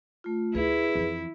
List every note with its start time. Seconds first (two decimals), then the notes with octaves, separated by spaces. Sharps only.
0.24 A3 F4
0.55 D2 E4 G#4 B4
0.95 F2 E3